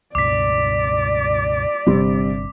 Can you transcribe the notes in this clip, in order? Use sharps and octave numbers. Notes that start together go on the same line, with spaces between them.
C#2 G2 B2 D5 D6 B6
G1 C3 G3 C4 D4